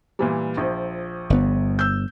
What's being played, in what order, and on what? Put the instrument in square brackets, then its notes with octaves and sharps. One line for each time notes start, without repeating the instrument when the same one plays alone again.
[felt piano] A#2 E3 G3
A#1 F3
[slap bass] G1 B3
[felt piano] E6 G6